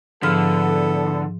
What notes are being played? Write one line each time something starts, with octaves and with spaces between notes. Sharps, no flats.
G#2 D3 F3 B3 E4 A4 F6